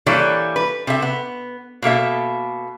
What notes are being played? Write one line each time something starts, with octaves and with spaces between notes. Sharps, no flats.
E3 G3 A#3 A4 C#5
B4
C3 A4 E5
B3
B2 A#3 A4 E5